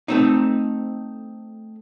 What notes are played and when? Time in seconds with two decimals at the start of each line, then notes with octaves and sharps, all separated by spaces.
0.08 A3 C4 D#4